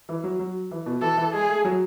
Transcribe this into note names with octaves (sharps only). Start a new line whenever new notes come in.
E3
F#3
F#3
E3
B2
E3 A4
E3
G#3 G#4
A3
F#3